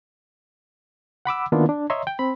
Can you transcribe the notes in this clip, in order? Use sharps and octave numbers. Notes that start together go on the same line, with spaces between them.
F#5 B5 D6 E6
D#3 A#3 B3 D4 E4 F4
D4
C#5 D#5 E5 A#5 C6
G5
C4 B5